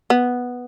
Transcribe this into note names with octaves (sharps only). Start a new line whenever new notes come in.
B3